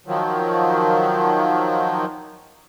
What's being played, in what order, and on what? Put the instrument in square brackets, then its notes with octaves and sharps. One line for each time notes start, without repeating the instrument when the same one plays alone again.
[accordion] D#3 F3 F#3